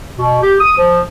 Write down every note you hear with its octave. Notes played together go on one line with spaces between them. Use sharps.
B2
G4
D#6
F3